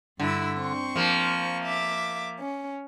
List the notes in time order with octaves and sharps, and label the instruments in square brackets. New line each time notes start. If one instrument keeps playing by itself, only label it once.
[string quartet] G2 E4 E6 [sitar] D3
[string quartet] C4 C5 C#6
[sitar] F3 A#3
[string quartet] E5 D6
C#4